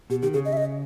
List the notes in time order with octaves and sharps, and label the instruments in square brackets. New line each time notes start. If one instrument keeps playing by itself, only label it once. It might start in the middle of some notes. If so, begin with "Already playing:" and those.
[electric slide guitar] B2 [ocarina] G4
[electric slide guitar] D#3 [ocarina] G4
[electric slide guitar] C#3 [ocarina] G#4
[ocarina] D#5
E5
D#5